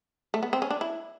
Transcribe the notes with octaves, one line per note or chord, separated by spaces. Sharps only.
A3
B3
C4
C#4
D4
E4